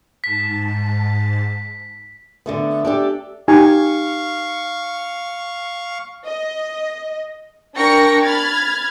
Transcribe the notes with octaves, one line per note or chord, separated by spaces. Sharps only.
G#2 A5 B6
D3 A3 B3
D4 G4 A4
D#4 G4 F5 G#5 C#6
D#5
D4 A#4 G5 C#6 A#6 C#7
B5 F6 G#6 A6